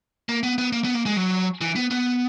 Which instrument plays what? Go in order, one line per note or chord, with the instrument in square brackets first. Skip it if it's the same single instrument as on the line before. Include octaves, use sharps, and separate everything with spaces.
[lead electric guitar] A#3
B3
B3
A#3
B3
A#3
G#3
F#3
E3
B3
B3